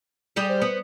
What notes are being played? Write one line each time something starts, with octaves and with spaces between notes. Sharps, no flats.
G3 G4 G#4
C5
B3